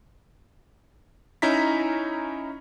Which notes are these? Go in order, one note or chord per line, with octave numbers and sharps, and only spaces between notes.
C#4 D#4 E4 A#5 B6